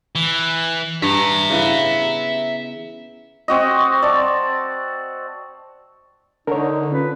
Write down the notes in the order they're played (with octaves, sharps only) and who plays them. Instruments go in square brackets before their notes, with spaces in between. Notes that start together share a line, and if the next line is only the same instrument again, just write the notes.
[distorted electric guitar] E3
[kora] G2 [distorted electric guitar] E5 A#5
[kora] C#3 E3 B3
[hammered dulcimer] C4 F#4 D#5
D5 A5
[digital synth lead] D3 [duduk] D#4 [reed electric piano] A#4 C#5
[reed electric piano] C#4 F4 [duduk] B4